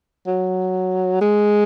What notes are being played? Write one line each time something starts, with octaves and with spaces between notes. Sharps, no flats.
F#3
G#3